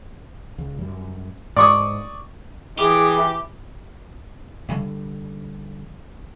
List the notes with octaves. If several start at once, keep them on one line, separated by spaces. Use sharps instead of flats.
C#2
F#2 G3
G#2 D5 C#6 D#6
E3 G4 G#4 D6
D3 G3